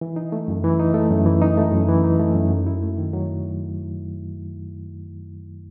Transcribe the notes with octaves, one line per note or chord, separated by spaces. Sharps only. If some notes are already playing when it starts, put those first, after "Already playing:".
E3
D#4
A3
F#2
E3
D#4
A3
F#2
E3
D#4
A3
F#2
E3
D#4
A3
F#2
F#3
E4
A3
D#3
F#3